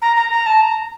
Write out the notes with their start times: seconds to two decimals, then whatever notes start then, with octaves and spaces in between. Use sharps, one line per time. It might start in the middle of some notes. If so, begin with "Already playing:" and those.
0.02 A#5
0.16 A#5
0.31 A#5
0.46 A5
0.61 A#5